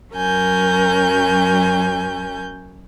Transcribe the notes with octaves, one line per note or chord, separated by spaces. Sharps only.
F#2 F#3 C#4 A#4 G#5 G6